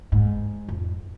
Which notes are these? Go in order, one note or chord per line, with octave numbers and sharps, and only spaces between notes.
G#2
F2